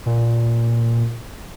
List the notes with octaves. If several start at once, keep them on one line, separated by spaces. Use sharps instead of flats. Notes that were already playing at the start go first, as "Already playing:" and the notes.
A#2